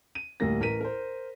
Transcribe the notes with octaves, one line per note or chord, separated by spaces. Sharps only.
D#7
D2 A2 G3 A#3 A#6
A1 A#4 B6 D#7
A#4 C5